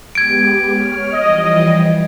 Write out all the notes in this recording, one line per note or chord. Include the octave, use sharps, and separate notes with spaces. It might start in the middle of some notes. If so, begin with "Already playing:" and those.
G#3 B3 G4 G#6 D7
C#5 F6
E3 F3 G3 D#5